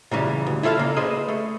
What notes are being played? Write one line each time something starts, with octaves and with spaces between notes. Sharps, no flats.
A#2 C#3 E3 G3
D2
E4 F4 A4 E5 F5
C#3 A#3
G#4 B4 C5 D#5
A3